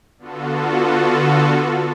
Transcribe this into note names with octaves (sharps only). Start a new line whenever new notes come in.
D3 B3 F4 F#4 A4